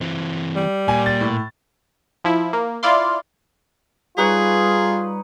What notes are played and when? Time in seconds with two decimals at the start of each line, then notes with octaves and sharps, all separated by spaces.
0.01 E3 C4
0.55 G3
0.88 A#2 G#5
1.06 A6
1.21 A2
2.24 F3 E4
2.53 A#3
2.83 E4 F4 D5 F5 C6
4.18 G3 D#4 F4 G#4 B4 C#5